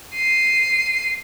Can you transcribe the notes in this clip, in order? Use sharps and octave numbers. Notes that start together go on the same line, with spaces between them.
C7 D#7